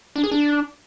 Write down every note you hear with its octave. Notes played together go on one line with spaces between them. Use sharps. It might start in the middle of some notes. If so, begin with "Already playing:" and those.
D4
G#4
D4